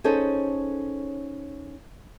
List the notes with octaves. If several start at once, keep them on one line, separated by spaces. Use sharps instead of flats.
C#4 D#4 G#4 A4 C5 C#5